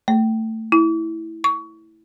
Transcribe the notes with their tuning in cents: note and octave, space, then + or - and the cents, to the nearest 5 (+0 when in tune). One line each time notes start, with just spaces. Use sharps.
A3 +20
E4 -10
C#6 +25